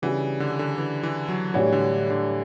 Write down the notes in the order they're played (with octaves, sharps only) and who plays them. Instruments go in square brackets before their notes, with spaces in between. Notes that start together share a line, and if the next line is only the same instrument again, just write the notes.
[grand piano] C#3 G3 D4 F#4 [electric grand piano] E3
[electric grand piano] D3
D3
E3
E3
F#3
[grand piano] A2 G3 D4 F#4 C#5 [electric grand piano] E3
[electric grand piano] D3
D3